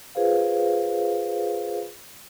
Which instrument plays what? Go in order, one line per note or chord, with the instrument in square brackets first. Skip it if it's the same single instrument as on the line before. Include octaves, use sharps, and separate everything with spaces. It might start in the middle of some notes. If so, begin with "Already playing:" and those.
[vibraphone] F4 G#4 B4 C5 F5